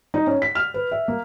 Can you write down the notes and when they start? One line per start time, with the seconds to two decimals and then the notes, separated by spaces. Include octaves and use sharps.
0.14 D#4
0.27 C#4
0.42 B6
0.55 F6
0.74 B4
0.92 E5
1.08 A#3